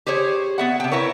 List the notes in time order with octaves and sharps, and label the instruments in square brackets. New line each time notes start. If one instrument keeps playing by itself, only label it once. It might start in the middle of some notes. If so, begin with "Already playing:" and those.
[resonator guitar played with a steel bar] G4 G#4 C5 C#5
B3 E5 F#5
C3 G5
E4 A#4 B4 C#5